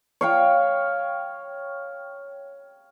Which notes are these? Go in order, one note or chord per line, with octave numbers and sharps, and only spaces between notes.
C#5 F5 G5